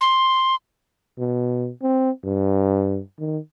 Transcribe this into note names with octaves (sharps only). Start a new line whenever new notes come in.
C6
B2
C4
G2
D#3